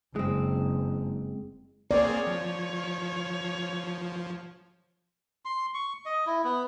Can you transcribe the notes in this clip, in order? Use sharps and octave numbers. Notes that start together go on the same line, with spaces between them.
F#1 G#3 C4
A#3 C4 G#4 C#5 D5
F3
C6
C#6
D#5
E4
B3